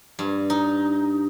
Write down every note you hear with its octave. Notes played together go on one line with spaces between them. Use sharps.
G2
D#4